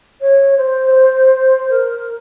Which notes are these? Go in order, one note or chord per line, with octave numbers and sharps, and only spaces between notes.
C#5
C5
A#4